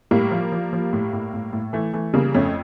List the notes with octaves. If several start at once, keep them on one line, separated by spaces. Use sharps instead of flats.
A2 G3 A#3
F3
F3
F3
A2
A2
A2
A2
E3 A3
E3 A3
C#3 G3 A#3
F2 A3 C#4